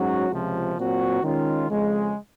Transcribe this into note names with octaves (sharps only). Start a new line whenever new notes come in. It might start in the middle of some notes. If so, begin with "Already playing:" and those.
Already playing: G#2 F#3 C#4 F#4
C#2 C3 F3
A#2 F#3 C4 F#4
D#3 G#3 C#4 F4
F2 C#3 G#3